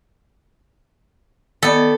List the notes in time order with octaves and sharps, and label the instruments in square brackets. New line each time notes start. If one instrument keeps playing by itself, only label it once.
[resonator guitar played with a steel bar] D#3 B3 D5 [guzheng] A4